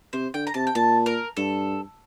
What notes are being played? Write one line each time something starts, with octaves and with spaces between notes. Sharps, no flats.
C3 C5
D3 G5
A#5
C3 A5
G5
A#2 A5
A#4
G2 A4